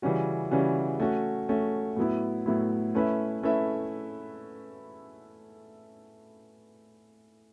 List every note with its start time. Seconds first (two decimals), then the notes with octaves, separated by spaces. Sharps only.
0.02 C#3 E3 G3 C#4 F#4
0.51 C#3 E3 G3 C#4 F#4
1.00 A3 C#4 F#4
1.49 A3 C#4 F#4
1.97 A2 F#3 B3 E4
2.46 A2 F#3 B3 E4
2.95 A3 C#4 E4 B4 E5
3.43 A3 C#4 E4 B4 E5